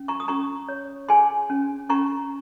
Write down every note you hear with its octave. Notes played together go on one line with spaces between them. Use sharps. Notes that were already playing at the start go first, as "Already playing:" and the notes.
Already playing: C#4
A#5 C#6
D#6
C#4 A#5 C#6
C#5
G#4 G#5 C6
C#4
C#4 A#5 C#6